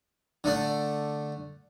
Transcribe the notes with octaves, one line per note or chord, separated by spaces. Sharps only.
D3 A3 D4